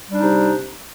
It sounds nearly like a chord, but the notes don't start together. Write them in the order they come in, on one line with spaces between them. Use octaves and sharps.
G3 D4 D#4 C3